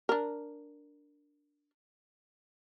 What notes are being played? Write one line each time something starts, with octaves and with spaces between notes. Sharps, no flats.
D4 A#4